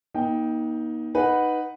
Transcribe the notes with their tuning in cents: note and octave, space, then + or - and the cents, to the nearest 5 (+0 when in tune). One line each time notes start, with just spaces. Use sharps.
A#3 +45 D#4 +15 G5 +0
D#4 +0 B4 +0 F#5 -5